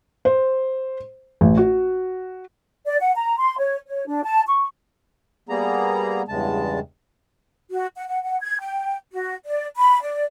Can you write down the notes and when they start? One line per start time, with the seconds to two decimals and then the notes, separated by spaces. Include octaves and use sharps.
0.25 C5
1.41 A1
1.57 F#4
2.86 D5
3.01 F#5
3.15 A#5
3.39 C6
3.58 C#5
3.87 C#5
4.08 D4
4.24 A5
4.47 C#6
5.49 G3 A#3 B3 G#4 A#5
6.28 E2 G2 C#3 G#3 A5
7.71 F#4
7.96 F#5
8.08 F#5
8.23 F#5
8.41 G#6
8.60 G5
9.12 F#4
9.45 D5
9.76 B5
10.02 D5